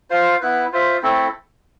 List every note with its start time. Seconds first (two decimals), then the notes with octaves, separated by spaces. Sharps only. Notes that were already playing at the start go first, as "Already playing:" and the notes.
0.10 F4 C5 F5
0.41 B3 E4 B4
0.73 F4 C5 E5
1.02 A3 C4 E4 A4